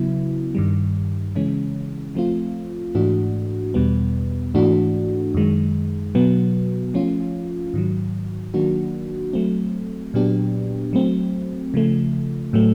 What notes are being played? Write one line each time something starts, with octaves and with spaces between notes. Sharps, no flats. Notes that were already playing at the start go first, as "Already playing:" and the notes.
Already playing: C#3 F#3 B3 E4
G2 D#3 G3
C#3 E3 G#3 C#4
F3 A3 C4 F4
G#2 E3 A3 D4 F#4
E2 B2 G3 B3
G#2 E3 A3 D4 F#4
F#2 D#3 G#3
B2 F#3 B3
F3 A3 C#4 F4
G#2 D#3 F#3
D#3 F#3 A#3 D4 F#4
F#3 A3 C4
A#2 F#3 B3 D4 G4
F#3 A3 C4
C#3 F3 A3
A2 F#3 A3